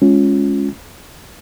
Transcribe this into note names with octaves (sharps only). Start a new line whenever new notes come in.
G#3 C#4 F4